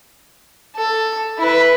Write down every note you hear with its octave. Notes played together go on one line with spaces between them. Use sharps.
A4
E4 B4